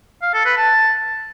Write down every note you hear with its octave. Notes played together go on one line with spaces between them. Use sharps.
F5
A4
B4
A5